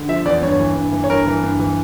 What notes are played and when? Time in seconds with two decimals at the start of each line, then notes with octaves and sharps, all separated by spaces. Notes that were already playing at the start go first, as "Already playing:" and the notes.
Already playing: D3
0.09 F3 E5
0.25 E2 D5
0.42 G2 C#5
0.60 E3
0.75 G2
0.92 E3
1.04 C#5
1.10 G2 A#4
1.27 E3
1.44 G2
1.59 E3